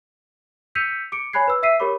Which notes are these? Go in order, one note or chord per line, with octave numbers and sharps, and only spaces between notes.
E6 G6 B6 C#7 D#7 F7
D6 C#7 D7
C#5 G#5 B5 F#6 G#6 C7
B4 E6
E5 E6 B6 C7 D#7
G4 A#4 C#5 B5 D6